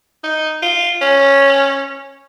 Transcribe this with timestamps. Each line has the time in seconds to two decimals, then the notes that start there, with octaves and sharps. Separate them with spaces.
0.24 D#4
0.63 F4
1.02 C#4